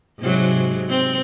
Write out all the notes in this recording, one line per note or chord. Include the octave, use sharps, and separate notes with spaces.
G#2 C3 F#3
C4